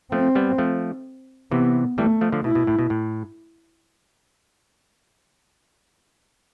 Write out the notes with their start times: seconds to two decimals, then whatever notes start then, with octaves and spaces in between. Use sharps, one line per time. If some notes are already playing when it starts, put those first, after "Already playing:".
0.12 F3 A3 C4
0.35 G3 B3
0.58 F3 A3
1.51 C3 E3 B3
1.98 E3 G3 A3
2.21 F3 A3
2.32 D3 F3
2.44 B2 E4
2.55 B2
2.67 A2
2.79 B2
2.90 A2